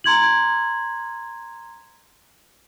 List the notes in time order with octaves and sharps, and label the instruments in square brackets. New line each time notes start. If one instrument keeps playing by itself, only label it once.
[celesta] A#5 C6 G#6 F#7